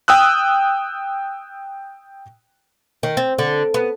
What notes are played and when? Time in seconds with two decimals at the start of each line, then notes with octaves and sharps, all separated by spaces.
0.08 G5 D#6 E6 F#6
3.03 D#3
3.17 C4
3.39 D3
3.74 B3